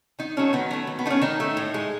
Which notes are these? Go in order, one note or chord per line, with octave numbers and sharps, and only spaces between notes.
D#3 D#4
F#3 A3 C#4
D#3 B3
F#3 A3
D#3
B3
A3 C#4 D#4
D#3 D#4
A3
A2
G#3